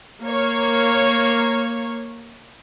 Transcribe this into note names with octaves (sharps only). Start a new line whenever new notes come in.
A#3 C#5